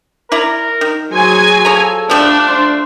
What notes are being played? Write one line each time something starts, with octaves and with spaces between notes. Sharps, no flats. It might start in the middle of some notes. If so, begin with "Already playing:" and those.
E4 A#4 D5 A#5
D#3
F#3 G#4 C5 G#5
F3 A4 C#5 A#5
F3 G3 A3 D4
C5